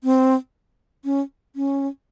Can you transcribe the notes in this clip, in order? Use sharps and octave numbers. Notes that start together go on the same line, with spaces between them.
C4
C#4
C#4